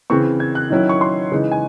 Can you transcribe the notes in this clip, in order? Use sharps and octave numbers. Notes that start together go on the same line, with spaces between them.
C#3 E3 C4 C#6
G#6
F#6
D#3 F#3 C#4 E4
C#6
C6
C#3 E3 G#3 D#4
G#5